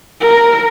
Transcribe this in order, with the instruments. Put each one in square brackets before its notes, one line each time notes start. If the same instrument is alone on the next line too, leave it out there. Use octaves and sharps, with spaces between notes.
[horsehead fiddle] A#4